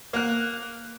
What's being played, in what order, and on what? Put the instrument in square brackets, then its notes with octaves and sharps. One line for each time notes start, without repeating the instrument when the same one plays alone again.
[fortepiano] A#3 F#6